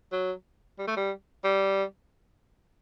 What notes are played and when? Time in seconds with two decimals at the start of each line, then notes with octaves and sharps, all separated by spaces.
0.12 F#3
0.78 G3
0.87 A3
0.96 G3
1.44 G3